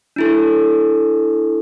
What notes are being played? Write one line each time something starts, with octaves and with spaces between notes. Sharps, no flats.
D4 E4 A4